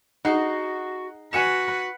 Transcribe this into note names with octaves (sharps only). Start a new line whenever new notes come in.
D#4 F#4 G#4 F#5 C7
F#4 B4 F#5 G#5 C#7 E7